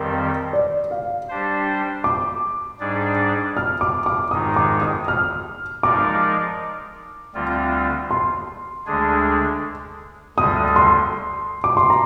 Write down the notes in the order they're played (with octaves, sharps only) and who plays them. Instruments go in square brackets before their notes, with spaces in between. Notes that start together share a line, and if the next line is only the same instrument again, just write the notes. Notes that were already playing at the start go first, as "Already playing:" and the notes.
Already playing: [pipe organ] F2 D#3 G3 C4 G4 [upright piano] A#4
[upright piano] D5
F5
[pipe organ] G3 D4 G4 C5
[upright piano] D6
[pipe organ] G#2 G3 D4 G#4 D5
[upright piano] F6
D6
D6
[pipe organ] G#2 D#3 G#3 D#4 [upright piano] D#6
[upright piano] D6
D#6
F6
[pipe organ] F3 G#3 D#4 A#4 D5 [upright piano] D6
[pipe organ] D2 D3 G3 C4 F4
[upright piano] C6
[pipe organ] D2 D3 G#3 D4 G#4
[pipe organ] D2 D3 G3 [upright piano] D#6
[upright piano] C6
D6
C6
A#5